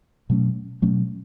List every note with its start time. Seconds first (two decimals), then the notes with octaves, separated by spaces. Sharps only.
0.30 B2 F#3 A3 C#4
0.82 B2 F#3 A3 C#4